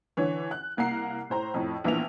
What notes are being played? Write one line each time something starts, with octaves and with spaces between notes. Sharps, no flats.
D3 E3 C#5
F#6
C2 A#3 F#5 A#5 C7
A2 C5 A#5
F2 A2
A#1 E3 A#3 B3 E5 F7